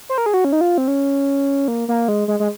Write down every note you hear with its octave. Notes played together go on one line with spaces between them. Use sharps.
C5
A#4
G#4
F#4
C#4
D#4
F4
C4
C#4
A#3
A#3
G#3
G#3
G#3